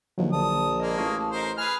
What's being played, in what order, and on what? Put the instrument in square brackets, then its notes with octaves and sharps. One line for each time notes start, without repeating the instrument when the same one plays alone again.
[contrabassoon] D#2 [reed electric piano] D3 F3 F#3
[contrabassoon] A#1 [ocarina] A5 [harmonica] D#6
[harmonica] G#3 A#3 [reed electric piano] D#5
[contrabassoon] A1 [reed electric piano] F5 C#6 D#6
[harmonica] D#4 A#4 C5
[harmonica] G#4 B4 F6 [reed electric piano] G#5